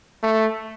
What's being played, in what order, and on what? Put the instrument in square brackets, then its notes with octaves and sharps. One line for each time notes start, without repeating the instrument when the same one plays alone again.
[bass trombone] A3